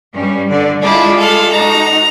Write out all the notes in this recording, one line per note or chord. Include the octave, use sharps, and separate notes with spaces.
G2 G3 C#4
G2 D3 D5
G#3 D4 E4 F4 G#4
A4 F5
D#4 F#4 A#5